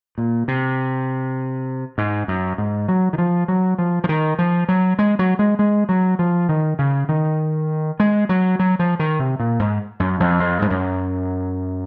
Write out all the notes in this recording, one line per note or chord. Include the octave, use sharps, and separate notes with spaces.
A#2
C3
G#2
F#2
G#2
F#3
D#3
F3
F#3
F3
F3
D#3
F3
F#3
G#3
F#3
G#3
G#3
F#3
F3
D#3
C#3
D#3
G#3
F#3
F#3
F3
D#3
C3
A#2
G#2
F#2
F2
F2
G#2
F#2